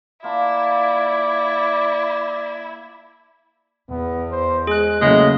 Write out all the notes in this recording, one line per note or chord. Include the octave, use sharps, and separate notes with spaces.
A#3 E4 F4 D5 A5
E2 B3
C5
G#3 G#4 F#6
A2 C#3 F#3 G#3 A#3